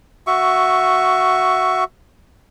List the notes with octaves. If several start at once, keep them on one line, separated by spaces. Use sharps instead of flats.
F#4 E5 C#6